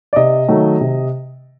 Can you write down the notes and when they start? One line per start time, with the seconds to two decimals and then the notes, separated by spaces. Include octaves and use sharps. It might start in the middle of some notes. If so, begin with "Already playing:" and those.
0.13 D5
0.16 C3 D#5
0.48 D#3 F#3 A3
0.81 C3